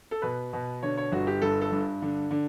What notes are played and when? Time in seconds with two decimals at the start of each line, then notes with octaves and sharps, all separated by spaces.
0.11 A4
0.22 B2 B4
0.53 B2
0.83 D3 C#5
0.97 C#5
1.12 G1 F#4
1.27 G4
1.42 G2 A4
1.61 A4
1.72 G2
2.02 D3
2.31 D3